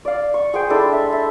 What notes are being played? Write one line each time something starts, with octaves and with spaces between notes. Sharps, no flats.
D5 F5
C#6
G#4 C5 G5
G#3 D4 E4 A4
E5
E5